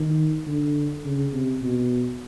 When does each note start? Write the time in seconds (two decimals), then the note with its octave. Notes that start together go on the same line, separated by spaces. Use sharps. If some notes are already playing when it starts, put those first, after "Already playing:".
Already playing: D#3
0.47 D3
1.05 C#3
1.33 C3
1.62 B2